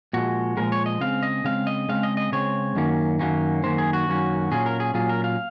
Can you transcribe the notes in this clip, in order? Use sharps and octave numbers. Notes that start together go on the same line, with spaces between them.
A#2 F3 G#3 F#4
A#2 F3 G#3 A#4
C#5
D#5
C#3 G#3 C4 F5
D#5
C#3 G#3 C4 F5
D#5
C#3 G#3 C4 F5
D#5
D#5
C#3 G#3 C4 C#5
F#2 D#3 F#3 A#3 C#4
F#2 D#3 F#3 A#3 C#4
F#2 D#3 F#3 A#3 C#4 C5
G#4
F#4
F#2 D#3 F#3 A#3 C#4
A#2 F#3 C#4 F4 G#4
A#4
G#4
A#2 F#3 C#4 F4 G#4
A#4
F5